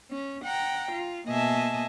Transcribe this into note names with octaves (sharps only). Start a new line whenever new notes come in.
C#4
F#5 G5 A#5
F4
B2 A#3 D#5 E5 G#5 A5